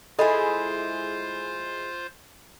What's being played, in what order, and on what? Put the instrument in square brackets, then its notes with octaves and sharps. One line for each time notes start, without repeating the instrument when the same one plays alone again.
[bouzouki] G#3 E4 G#4 [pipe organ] F4 C5 [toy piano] A4 D#5 B5